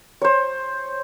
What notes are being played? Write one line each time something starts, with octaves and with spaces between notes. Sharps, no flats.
C5 C#5